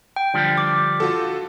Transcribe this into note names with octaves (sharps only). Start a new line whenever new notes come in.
G5
D3 F3 G3
D6
F4 F#4 A4